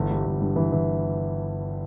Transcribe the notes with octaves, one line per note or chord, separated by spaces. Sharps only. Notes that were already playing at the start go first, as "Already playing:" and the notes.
Already playing: G1 E3
G3
G1
G2
E3
E3